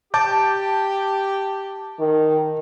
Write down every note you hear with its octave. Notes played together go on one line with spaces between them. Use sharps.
G4 A5 D6 G6
D#3